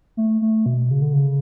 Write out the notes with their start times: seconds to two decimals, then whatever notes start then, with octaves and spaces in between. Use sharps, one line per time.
0.17 A3
0.42 A3
0.66 B2
0.91 C#3
1.02 D3
1.13 C#3